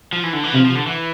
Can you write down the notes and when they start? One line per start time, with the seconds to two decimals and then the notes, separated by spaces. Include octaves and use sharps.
0.13 F3
0.23 E3
0.33 D3
0.44 E3
0.54 C3 F3
0.65 F3
0.75 D3
0.86 E3